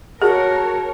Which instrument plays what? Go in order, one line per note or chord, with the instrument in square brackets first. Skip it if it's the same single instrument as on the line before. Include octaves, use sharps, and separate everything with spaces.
[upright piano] F#4 [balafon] G#4 [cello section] A#4 C#5 [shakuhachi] A5